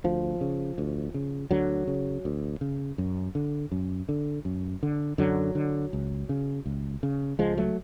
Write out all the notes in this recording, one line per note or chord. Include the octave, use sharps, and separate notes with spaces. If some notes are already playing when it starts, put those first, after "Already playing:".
D2 F3
C#3
D2
C#3
D2 D3 F#3
C#3
D2
C#3
F#2
D3
F#2
D3
F#2
D3
F#2 D3 F#3
D3
C#2
C#3
C#2
C#3
C#2 F3 G#3
F#3 A3